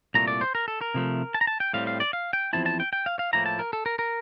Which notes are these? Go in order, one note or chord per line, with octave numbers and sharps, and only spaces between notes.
C2 A#2 A3 A#5
D5
C5
A#4
A4
A#4
C3 F3 A3
A5
A#5
A5
G5
A2 G3 C4 F5
F5
D5
F5
G5
E2 C3 F3 C4 E4 A5
A5
G5
G5
F5
F5
A2 F3 A#3 E4 A#5
A5
A#4
A4
A#4
A#4